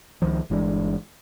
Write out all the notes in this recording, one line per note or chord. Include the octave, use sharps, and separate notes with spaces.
C#2 D#3 F3
G1 E3 G#3 D4